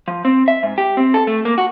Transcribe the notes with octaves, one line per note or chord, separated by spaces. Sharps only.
F3
C4
E5
G#2
G4
C4
A4
A3
A#3
F#4